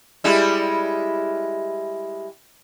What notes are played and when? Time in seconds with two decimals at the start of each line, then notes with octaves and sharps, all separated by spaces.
0.24 G3 G#3 E4